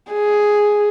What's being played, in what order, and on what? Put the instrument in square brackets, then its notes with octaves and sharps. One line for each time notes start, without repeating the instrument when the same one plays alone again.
[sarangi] G#4